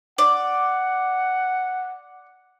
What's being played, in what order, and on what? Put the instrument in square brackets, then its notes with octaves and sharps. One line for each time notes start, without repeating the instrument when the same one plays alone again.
[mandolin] D5 [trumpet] F#5